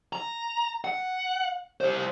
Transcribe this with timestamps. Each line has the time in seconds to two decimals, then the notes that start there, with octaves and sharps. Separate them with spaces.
0.13 A#5
0.85 F#5
1.81 G3 C5